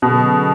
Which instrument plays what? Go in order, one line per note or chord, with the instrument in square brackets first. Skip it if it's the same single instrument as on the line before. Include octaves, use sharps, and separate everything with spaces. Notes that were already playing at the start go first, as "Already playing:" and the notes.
[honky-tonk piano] B2 [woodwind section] D3 F#3 C#4 G#4